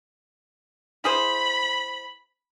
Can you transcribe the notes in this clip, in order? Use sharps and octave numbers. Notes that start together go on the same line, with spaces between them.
E4 G#4 C5 B5